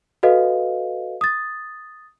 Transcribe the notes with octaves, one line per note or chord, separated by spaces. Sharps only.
F#4 A4 B4 D#5 F5
D#6 A6